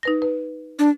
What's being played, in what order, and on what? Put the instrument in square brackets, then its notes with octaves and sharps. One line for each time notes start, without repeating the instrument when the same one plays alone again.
[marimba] D#4 B4 A#6
B4
[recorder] D4